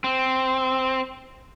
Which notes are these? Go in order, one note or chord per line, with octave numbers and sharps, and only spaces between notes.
C4